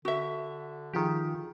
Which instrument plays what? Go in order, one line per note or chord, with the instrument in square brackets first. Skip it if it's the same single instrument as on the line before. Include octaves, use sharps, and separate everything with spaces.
[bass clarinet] D3 [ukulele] F#4 E5
[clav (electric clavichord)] D#3 G4 [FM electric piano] F3 F4 G#4